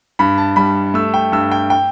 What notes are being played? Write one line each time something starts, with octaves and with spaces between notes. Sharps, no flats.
G2 B5
A5
G3 B5
A3 E6
G5
G2 E6
G5
G5